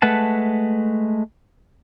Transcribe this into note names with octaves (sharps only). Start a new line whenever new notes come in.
G#3 A3 B4 F#5 A5